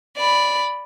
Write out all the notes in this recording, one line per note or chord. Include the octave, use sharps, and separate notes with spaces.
D5 B5